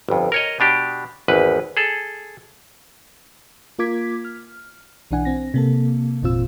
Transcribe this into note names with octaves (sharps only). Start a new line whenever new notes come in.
G1 F2
A#4 C#5 D#5
B2 D4 G4
G#1 E2 B4
G#4 A4
A#3 F4 A#4 D6 G#6 B6
F6
B1 E3 D4 F#5 G#5
C4 A#6
C3 A#3 A4
G1 E2 A#2 C4 F4 E6